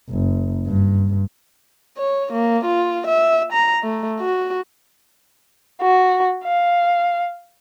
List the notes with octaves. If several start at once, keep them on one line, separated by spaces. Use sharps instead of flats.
F#1
G2
C#5
A#3
F4
E5
A#5
A3
F#4
F#4
F5